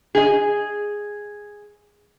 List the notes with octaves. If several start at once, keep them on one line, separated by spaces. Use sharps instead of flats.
G#4 D#5